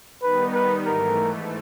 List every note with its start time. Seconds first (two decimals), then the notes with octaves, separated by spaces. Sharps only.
0.22 D#3 G3 B3 D#4 B4
0.54 B4
0.85 G#2 E3 A3 A#4